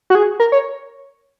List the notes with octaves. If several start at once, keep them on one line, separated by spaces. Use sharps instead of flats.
F#4
G#4
A#4
C#5